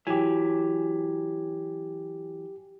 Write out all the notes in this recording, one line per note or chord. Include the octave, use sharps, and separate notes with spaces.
E3 F#3 G4 G#5